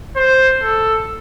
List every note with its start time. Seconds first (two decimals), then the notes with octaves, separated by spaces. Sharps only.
0.16 C5
0.63 A4